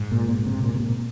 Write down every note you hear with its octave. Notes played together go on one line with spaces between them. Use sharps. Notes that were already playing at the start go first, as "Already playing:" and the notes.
Already playing: G#2
A#2
A#2
A#2
C3
A#2
C3
A#2